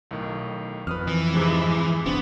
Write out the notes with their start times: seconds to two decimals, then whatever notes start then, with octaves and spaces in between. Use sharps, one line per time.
0.11 B1 A2 D#3
0.87 F2 B4 D#6 F6
1.07 E3
1.34 G#2 C3 G#3
2.06 F1 B3 C4 D4